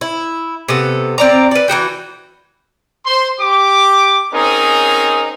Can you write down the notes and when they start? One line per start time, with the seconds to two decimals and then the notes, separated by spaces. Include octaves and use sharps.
0.01 E4
0.69 C3 B3 A4
1.18 C4 D5 A#5
1.51 B4 D5
1.68 E3 D#4 F#4 G5
3.06 C5 C6
3.40 G4 D6
4.33 C4 C#4 D#4 G#4 A#4